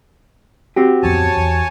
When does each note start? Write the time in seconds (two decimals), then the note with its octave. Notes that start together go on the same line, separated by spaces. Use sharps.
0.76 C4 F#4 G4
1.03 D1 F2 B3 C#5 G#5 A5
1.37 E2